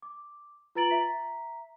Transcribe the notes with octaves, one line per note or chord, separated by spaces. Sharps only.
D6
F4 B4 A#5 A6 D7 F#7
E5 A#5 B6